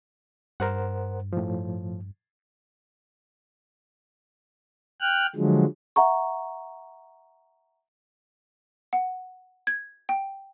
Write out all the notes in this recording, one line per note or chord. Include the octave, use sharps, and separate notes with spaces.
G2 A#4 C5 F#5
A2 F3
G5 F6 F#6
D3 F3 F#3 G#3
E5 F#5 A#5 C#6
F#5
G#6
G5